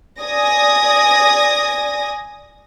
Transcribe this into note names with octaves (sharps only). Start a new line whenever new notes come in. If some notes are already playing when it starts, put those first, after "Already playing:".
D5 G#5 D#6 A#6